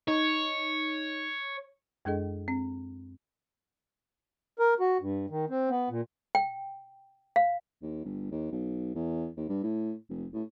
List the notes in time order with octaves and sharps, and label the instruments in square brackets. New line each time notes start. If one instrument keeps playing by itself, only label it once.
[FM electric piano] D#4 [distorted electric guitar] C#5
[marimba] F#2 G#3 D4 G#4 A4 D#5
C4
[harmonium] A#4
F#4
G2
D#3
C4
B3
A#2
[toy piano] G5
F5
[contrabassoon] D#2
G1
D#2
B1
E2
D#2
G2
A2
F1
A2